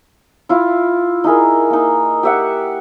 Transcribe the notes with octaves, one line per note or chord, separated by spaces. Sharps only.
E4 F4 F5
D#4 E4 G#4 A#4
A#3 D#4
G4 E5 F#5